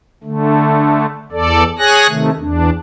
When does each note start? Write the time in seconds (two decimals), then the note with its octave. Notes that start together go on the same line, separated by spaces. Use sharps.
0.24 D3 A3
1.32 E2 A4 D5
1.79 G#4 C#5 G#5 F#6 A#6
2.08 C3 D#3 A3
2.39 E2 D4